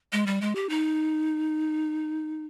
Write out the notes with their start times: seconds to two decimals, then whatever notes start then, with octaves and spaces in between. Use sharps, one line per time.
0.13 G#3
0.26 G3
0.41 G#3
0.55 G4
0.69 D#4